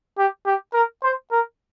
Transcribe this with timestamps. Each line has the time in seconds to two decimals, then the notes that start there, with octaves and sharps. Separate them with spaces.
0.18 G4
0.46 G4
0.74 A#4
1.03 C5
1.31 A#4